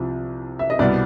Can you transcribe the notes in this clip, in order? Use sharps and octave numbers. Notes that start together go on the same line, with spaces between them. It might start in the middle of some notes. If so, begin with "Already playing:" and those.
Already playing: C2 C3 F3
E5
D#5
C2 B2 G3 B3 D5